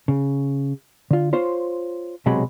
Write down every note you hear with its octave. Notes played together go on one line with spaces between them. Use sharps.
C#3
D3 F4
F4 C5 C#5
B1 C3 F#3 G#3 B5